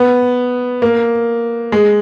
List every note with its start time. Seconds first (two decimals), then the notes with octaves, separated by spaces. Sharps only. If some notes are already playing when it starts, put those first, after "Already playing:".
Already playing: B3
0.82 A#3
1.72 G#3